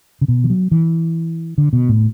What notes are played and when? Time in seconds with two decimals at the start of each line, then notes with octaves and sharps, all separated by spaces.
0.21 C#3
0.28 B2
0.44 E3
0.50 F#3
0.71 E3
1.58 D3
1.73 B2
1.89 A2